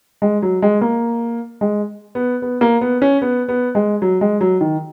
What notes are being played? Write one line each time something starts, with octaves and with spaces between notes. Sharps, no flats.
G#3
F#3
G#3
A#3
G#3
B3
B3
A#3
B3
C#4
B3
B3
G#3
F#3
G#3
F#3
D#3